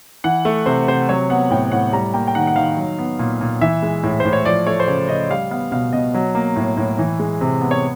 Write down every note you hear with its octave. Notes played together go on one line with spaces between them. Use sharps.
E3 F#5
A3
C3 C5
C3 C5
F#3 C#5
B3 F#5
A2 G5
A2 F#5
G3 A#5
A#3 G5
G5
D#3 F#5
F#5
D#3 F5
F#3
B3
A#2
A#2
E3 E5
G#3
A2
A2 C5
C#5
F3 D5
A3 C#5
C5
C#3 C#5
C#3 D#5
G3 F5
B3 F5
B2 F5
B2 D#5
F#3
A#3
A2
A2
E3
G#3
C3
B3
C#5